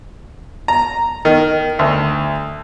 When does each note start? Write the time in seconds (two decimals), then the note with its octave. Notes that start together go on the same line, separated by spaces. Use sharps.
0.68 A#5
1.25 D#3
1.79 D2